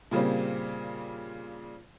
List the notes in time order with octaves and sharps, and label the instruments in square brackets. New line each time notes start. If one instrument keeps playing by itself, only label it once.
[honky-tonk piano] A#2 C#3 G3 A#3 C4